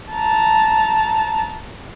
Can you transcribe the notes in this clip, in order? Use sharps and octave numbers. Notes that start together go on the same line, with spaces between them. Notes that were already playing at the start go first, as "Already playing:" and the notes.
A5 A#5